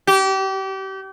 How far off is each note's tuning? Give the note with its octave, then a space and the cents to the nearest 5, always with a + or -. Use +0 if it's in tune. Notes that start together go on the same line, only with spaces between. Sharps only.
G4 -30